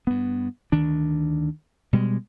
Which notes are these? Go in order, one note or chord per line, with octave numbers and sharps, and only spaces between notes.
G2 B3
D2 D#3 D4
B2 G3 G#3